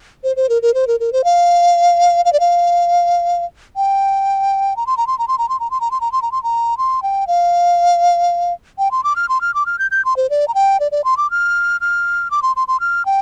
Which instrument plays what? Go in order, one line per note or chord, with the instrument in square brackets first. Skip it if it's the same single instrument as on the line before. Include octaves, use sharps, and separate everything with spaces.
[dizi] C5
C5
A#4
A#4
C5
A#4
A#4
C5
F5
F5
D5
F5
G5
A#5
C6
A#5
C6
A#5
C6
A#5
C6
A#5
C6
A#5
C6
A#5
C6
A#5
C6
A#5
C6
G5
F5
G5
C6
D6
F6
C6
F6
D6
F6
G6
G6
C6
C5
D5
A#5
G5
D5
D5
C6
D6
F6
F6
D6
C6
C6
C6
F6
G5